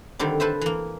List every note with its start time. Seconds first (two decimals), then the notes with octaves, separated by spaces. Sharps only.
0.19 D3 D#3 G3 C4 D4
0.40 A4 B4 C5 E5
0.61 E3 A#3